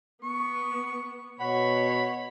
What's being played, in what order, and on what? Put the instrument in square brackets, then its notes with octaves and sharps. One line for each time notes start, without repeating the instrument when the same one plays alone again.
[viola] B3 [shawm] C#6
[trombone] B2 [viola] C#5 [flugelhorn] F#5 [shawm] B5